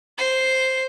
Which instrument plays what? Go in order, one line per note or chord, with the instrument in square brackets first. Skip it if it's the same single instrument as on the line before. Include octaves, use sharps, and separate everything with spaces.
[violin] C5 C7